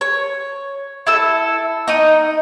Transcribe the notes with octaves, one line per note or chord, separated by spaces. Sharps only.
C#5
E4 A4 E6
D#4 D#5 D#6